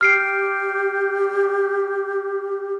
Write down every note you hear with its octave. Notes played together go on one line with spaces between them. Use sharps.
G4 F6 C7 D7